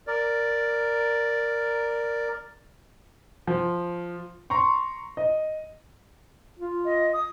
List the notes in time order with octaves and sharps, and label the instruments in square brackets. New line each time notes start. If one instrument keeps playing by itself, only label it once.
[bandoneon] A#4 D5
[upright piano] F3
A#5 C6 C#6
D#5
[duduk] F4
[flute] D#5
D#6